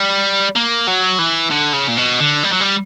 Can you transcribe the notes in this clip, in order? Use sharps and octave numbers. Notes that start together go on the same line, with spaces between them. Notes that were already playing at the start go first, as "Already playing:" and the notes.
Already playing: G3
A#3
F#3
E3
D3
C#3
A#2
B2
D3
G3
F#3
G3